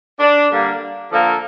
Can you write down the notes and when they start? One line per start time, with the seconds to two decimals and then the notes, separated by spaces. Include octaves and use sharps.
0.20 D4
0.51 D3 G3 A#3
1.11 D3 F3 A#3 A4